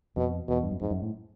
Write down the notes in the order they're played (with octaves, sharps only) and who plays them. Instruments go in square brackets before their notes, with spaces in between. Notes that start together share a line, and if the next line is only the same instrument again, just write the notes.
[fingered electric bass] F2 [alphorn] B2
[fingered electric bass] E2 [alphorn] B2
[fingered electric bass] G2
F#2
[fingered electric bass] F2 [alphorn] G#2
[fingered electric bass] F#2
A2